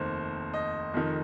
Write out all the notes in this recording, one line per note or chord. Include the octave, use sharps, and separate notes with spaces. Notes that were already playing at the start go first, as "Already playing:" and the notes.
Already playing: F1 D#2 D#3 C5
D#5
F1 F2 D#3